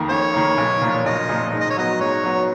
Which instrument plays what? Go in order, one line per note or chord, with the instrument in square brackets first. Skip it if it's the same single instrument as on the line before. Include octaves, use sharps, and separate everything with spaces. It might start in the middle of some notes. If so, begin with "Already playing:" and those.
Already playing: [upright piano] F2 D#3 A#3
[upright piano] F2 [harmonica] C#5
[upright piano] D#3 A#3
B1
A#2 F3 A#3 F4
[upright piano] B1 [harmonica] D#5
[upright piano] A#2 F3 A#3 F4
G#2
[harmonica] D#5
C#5
[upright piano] F#3 B3 [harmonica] D#5
[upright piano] G#2 [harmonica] C#5
[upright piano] F#3 B3